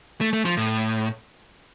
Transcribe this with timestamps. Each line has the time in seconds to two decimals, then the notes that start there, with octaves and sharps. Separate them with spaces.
0.21 A3
0.33 A3
0.45 F3
0.57 A2